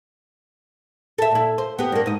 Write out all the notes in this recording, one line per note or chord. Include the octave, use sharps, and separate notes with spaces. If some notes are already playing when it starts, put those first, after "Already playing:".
A4 E5
A#2 E4
C5
B3 G4
G2 A#3
G#2 D#5